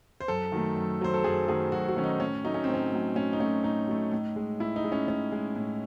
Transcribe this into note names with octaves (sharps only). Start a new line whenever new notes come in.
C5
F#2 A4
D#3 F#3 A3
F#2
D#3 F#3 A3 C5
A4
F#2 G#4
D#3 F#3 A3 G#4
F#2 F#4
F#4
D#3 F#3 A3 C#4
D#4
A2 C#4
F#3 A3 D#4
C#4
A2 C4
C#4
F#3 A3
A2 C#4
D#4
F#3 A3 C#4
A2 D#4
F#3 A3
A2
G#3
A2 E4
D#4
G#3
C#4
A2 C#4
G#3
A2